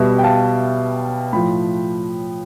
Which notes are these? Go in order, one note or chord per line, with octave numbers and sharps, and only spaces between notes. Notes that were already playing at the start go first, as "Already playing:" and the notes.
Already playing: B2 G3 E5
G5
F5 A5
A2 F3 G5 B5